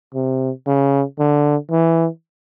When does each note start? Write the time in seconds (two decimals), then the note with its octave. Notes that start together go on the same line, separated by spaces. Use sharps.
0.14 C3
0.66 C#3
1.19 D3
1.71 E3